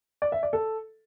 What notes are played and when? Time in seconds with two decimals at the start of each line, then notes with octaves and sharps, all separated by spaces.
0.22 D5
0.32 E5
0.43 D5
0.53 A4